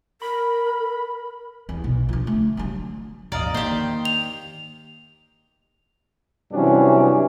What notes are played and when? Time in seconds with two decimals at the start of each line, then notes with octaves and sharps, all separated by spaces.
0.22 A#4 B5
1.69 E2
1.84 B1
2.09 D3 F3
2.27 A3
2.57 D3 F#3
3.32 D#1 G#1 F2 D5 D#5 F5 A#5
3.54 D#3 A#3 G4 C5
4.05 F7
6.52 G2 C3 E3 F#3 C#4 D4